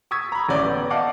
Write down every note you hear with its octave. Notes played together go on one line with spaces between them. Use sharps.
C#6 D#6 E6 G#6 B6
A#5 B5
A1 C#4 D5 G6
B3
D5 D#5 F5 F#5 A5 D6